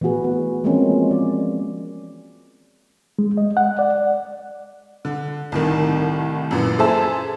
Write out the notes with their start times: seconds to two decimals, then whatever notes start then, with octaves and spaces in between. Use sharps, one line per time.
0.01 E3 A3 B3 F#4 G#4 B4
0.24 B3
0.64 E3 F3 G#3 A#3 C4 C#4
1.11 D5
3.19 G#3
3.37 D#5
3.57 F#5
3.79 D5
5.05 D3
5.52 C2 A2 D#3
6.51 F#2 A#2 E3
6.79 G#4 A4 C5 E5 A5